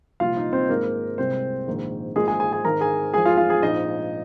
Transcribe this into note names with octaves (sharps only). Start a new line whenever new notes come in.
C2 A#2 F3 F4 F5
D#4 D#5
C4 C5
G#1 G#2 G#3 A#3 A#4
C2 C3 G#3 C4 C5
A#1 G#2 D#3 A#3
G#1 G#2 F3 G#3 A#3 G#4
G#4 G#5
G#4 G#5
G#4 G#5
G#1 G#2 D#3 A#4 A#5
G#4 G#5
F2 F3 G#3 G#4 G#5
F4 F5
F4 F5
G#4 G#5
A#1 G#2 F3 D#4 D#5